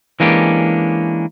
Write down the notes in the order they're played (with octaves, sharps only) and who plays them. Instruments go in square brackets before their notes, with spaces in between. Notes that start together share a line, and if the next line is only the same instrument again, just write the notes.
[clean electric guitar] E3 G#3 A#3 C#4 D4 G4